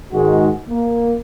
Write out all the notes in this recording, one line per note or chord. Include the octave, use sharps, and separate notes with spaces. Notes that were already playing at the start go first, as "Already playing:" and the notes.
G#2 D#3 G#3 F#4
A#3